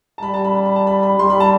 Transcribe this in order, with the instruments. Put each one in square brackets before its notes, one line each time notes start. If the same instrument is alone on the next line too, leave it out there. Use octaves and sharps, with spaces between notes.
[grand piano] A5
[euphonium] G3 [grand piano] B5
[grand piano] A5
B5
B5
B5
A5
B5
B5
[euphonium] G3 [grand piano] C6
[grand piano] B5
A5